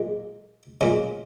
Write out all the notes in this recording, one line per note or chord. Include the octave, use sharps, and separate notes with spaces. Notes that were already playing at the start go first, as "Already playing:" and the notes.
Already playing: A#2 G#3
A#2 G#3 C#4